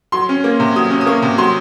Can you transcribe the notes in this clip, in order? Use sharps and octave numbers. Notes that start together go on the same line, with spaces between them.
F#3 C6
C#4
A#3
C3
F#3 D#6
C#4
D#6
A#3 C#6
C3
F#3 C6